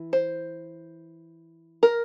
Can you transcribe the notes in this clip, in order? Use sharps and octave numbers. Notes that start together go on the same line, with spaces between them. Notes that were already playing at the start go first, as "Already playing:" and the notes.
Already playing: E3
C5
A#4